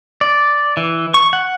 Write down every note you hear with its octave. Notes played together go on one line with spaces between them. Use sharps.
D5
E3
C#6
F#5